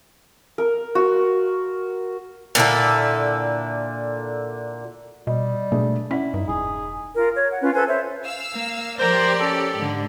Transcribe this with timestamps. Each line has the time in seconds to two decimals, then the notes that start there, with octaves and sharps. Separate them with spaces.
0.58 A#4
0.95 F#4
2.55 A#2 D3 E4 A4
5.27 B2 G3 D#5
5.72 B2 A3 D4 G#4
6.11 C#4 E4 D5 F#5 B6
6.34 G2 D#4
6.48 E1 G#4
7.15 F4 A#4
7.35 C#5
7.50 F#5
7.62 C#4 F4 B4
7.74 A4 B4 C5 G#5
7.88 C5 C#5 E5
8.23 F5 E6
8.53 A#3
8.99 F3 G4 A#4 C5 D5 C6
9.40 C#4 A4
9.76 G#2 D3